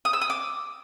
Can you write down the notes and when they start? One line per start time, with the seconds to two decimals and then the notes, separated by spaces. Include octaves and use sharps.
0.05 D#6
0.13 E6
0.21 D#6
0.30 D6